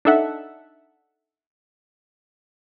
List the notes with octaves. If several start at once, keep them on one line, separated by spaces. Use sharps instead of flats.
D4 D#4 A4 E5 F#5